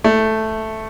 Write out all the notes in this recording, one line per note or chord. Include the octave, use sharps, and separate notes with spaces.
A3